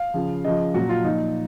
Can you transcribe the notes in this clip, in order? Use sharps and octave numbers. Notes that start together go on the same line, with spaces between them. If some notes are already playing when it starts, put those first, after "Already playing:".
Already playing: F5
C#3 F3
C#3 F3 D#5
A#2 F#3 F#4
F4
A#2 F3 D#4